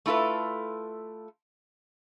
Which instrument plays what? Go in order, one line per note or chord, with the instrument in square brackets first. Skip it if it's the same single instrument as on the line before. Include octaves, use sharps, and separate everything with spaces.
[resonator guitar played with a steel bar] A3 E4 F4 A4 B4